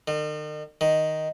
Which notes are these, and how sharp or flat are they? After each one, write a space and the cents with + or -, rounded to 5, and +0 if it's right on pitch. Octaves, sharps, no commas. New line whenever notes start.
D#3 -45
D#3 +0